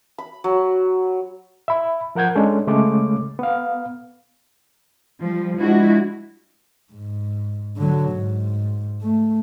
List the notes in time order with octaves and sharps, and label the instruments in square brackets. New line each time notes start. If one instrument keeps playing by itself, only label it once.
[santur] B5
F#3
[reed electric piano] E5 B5
F3 A#4 F#5 G6 G#6
G#3 C#4 D4 A4
C#3 G#3 A3 C#4 D6
B3 F5
[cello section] F3 G3
F3 G#3 D4 E4 F#4
[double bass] G#2
D3 F#3
G#2
A3